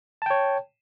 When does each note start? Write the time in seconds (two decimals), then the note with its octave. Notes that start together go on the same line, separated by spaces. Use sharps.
0.22 A5
0.26 G5
0.30 C#5